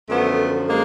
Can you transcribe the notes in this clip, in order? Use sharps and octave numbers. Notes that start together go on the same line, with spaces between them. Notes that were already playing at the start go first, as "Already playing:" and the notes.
F#2 D3 F3 A3 B3
G#3 A#3